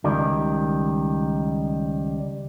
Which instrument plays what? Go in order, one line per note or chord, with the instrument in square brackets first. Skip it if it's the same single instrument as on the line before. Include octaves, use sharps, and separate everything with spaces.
[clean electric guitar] C#2 D#3 G3